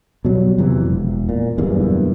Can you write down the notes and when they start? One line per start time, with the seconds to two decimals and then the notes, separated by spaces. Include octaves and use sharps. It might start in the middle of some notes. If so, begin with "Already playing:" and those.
0.25 B2 F#3 G3
0.58 F2 C3 E3
0.85 E1
1.29 A#2
1.58 F#1 E2 G2 A#2